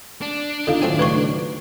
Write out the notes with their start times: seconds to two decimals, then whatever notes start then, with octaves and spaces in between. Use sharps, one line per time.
0.22 D4
0.67 E2 D3 D#4 F4 A4 F5
0.82 A2 D#3 F#3 A3 C4 G#5
0.99 C#2 G#2 B4 C6 C#6